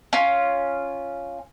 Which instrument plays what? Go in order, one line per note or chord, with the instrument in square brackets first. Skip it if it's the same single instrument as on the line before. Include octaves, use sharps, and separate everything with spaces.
[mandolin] C#4 F4